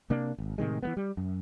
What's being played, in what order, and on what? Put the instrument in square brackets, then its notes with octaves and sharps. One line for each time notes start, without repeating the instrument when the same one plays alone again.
[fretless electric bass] C3 A#3 D4
G#1
A2 C3 D#3 G#3
E3 G#3 B3
G3
F#2